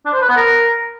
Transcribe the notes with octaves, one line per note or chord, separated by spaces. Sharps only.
D4
C5
B4
B3
A#4